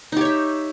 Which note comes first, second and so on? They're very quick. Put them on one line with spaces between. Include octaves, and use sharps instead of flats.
D#4 G4 C#5 E5